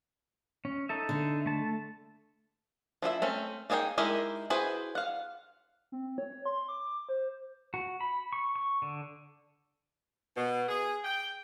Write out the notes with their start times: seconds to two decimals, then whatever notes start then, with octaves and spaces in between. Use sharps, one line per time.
0.65 C#4
0.89 D#4 A4 E5
1.09 D3
1.46 A3 A5
3.02 F3 E4 G#4 E5
3.22 A3 C4 C#4
3.70 A#3 D#4 G#4 C#5 G5
3.98 G#3 D#4 E4 G4 A#4
4.50 E4 F#4 G#4 B4 C5
4.95 F5 F#5
5.92 C4
6.18 C#5
6.46 C6
6.69 D6
7.09 C5
7.74 F#4
8.01 B5
8.33 C#6
8.56 C#6
8.82 D3
10.36 B2
10.68 G#4
11.04 G5